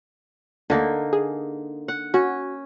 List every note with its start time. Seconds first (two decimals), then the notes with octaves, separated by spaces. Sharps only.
0.70 D2 D3 A#3 D#4
1.13 G#4
1.88 F#5
2.14 C#4 F#4